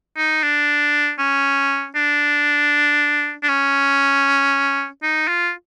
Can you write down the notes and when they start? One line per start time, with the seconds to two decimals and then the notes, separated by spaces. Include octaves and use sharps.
0.17 D#4
0.43 D4
1.19 C#4
1.96 D4
3.43 D4
3.49 C#4
5.03 D#4
5.28 F4